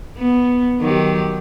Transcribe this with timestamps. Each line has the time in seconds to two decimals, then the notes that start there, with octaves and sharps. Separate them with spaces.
0.18 B3
0.80 D#3 F#3 G4